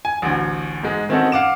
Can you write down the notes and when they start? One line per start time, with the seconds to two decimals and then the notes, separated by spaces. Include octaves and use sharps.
0.05 G#5
0.22 A1 D2
0.83 G#2 G#3
1.09 D#3 C4 C#4 D#4 F#4 A4
1.32 F5 F#5 D6 E7